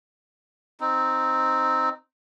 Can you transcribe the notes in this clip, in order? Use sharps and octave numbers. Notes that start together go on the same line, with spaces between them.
C4 D#4